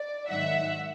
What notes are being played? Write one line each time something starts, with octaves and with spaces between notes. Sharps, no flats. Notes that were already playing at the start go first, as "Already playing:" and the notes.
Already playing: D5
G#2 D#3 F#3 E5 F#5